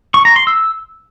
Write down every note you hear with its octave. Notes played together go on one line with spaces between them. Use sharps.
C#6
A#5
C6
E6